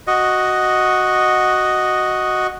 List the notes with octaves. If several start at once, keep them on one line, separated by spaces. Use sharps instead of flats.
F#4 D#5